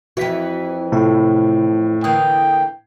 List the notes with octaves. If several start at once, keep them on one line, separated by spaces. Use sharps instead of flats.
F2 E3 F#4 E5 B6
A2 C3 F4
D3 E3 A#3 G5 D#6